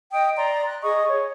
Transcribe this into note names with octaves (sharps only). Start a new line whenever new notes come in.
D#5 G5 D#6
D5 A#5 C6
F#6
G#4 D#5 C#6 D#6
C#5